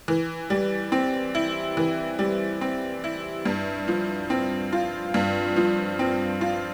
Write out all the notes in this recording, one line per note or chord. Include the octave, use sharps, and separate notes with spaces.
E3
G3
C4
E4
E3
G3
C4
E4
G2
F3
C4
F4
G2
F3
C4
F4